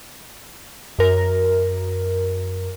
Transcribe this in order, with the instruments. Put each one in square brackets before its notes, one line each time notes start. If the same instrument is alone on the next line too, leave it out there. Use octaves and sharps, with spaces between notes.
[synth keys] F#2 A#4